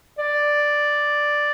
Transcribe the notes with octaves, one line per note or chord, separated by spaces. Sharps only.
D5